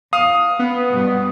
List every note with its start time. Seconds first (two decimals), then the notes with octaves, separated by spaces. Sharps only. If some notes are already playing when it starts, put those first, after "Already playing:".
0.13 E2 F5 D#6
0.59 B3
0.90 G2 B2 G3